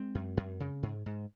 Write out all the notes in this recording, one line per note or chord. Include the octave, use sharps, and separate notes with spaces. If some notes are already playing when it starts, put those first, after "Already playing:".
Already playing: G#3 C4
F#2
F#2
C#3
G#2
G#2